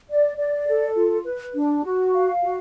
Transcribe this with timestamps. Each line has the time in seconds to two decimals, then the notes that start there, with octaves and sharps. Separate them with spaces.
0.09 D5
0.38 D5
0.67 A4
0.96 F4
1.25 B4
1.54 D4
1.84 F#4
2.13 F5
2.42 F#4